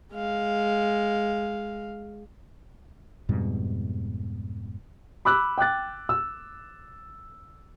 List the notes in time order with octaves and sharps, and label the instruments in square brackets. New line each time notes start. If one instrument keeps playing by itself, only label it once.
[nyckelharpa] G#3 F5
[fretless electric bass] F2 G#2 B2 G3
[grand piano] B5 D6 E6 F#6
G5 D6 F#6 A6
E6